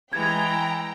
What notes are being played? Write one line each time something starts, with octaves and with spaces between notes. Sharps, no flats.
E3 G#3 G5 A#5 G#6